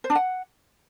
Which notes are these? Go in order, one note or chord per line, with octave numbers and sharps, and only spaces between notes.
C5
D4
F#5